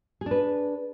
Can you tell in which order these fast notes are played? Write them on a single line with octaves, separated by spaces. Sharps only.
G#4 D4 B4